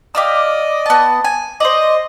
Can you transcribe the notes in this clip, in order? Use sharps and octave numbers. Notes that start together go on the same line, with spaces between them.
G4 D5 D#5 F5 E6
B3 A5
G#5
C5 D5 D#5